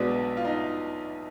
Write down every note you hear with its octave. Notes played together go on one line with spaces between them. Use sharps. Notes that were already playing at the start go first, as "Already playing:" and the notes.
Already playing: B1 B2 G#3 B3 D4
F4
D#4